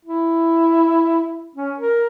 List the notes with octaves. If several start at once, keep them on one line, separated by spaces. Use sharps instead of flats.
E4
C#4
A#4